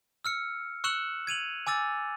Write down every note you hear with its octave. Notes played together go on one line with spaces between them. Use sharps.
E6 F6 C#7
C#6 E6 F#6 C#7 E7 F#7
G#6 D#7 F7 F#7
G#5 D6 E6 A6